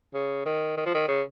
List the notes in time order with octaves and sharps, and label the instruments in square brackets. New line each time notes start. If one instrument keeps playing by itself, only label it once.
[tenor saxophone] C#3
D#3
D#3
F3
D#3
C#3